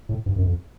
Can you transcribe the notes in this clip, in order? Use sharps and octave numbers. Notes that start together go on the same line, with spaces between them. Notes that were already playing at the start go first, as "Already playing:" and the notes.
A2
G2
F#2
F2